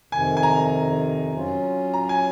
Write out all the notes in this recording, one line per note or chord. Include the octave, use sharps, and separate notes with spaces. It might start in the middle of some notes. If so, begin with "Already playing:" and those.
F2 C3 D#3 G#5
G#5
A#5
F#3 C#4 F4
A#5
G#5